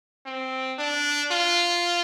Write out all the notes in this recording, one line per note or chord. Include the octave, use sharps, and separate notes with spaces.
C4
D4
F4